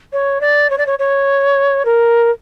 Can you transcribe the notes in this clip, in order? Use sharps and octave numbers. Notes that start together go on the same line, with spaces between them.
C#5
D5
C#5
D5
C#5
C#5
A#4